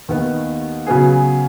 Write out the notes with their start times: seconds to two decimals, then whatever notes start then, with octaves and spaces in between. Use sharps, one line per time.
0.08 D#2 D#3 B3
0.86 C#3 F#3 B3 G#4